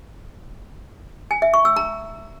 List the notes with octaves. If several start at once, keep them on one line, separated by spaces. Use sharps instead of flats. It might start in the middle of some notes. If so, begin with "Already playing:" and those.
G#5
E5
C#6
E6
A#5